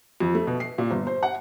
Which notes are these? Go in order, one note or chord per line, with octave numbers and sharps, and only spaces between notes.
F2
A3
B2
C7
A#2
G1
C5
F#5